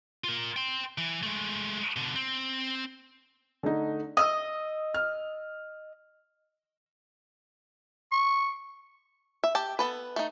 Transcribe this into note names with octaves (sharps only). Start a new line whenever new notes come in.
F4 A#4
G5 C6
E3
G#3 A3
B2 D3
C4
D3 A3 D#4
D#5 D#6 E6
F6
C#6
E5
G4 A5
B3 A4 B4
A3 D#4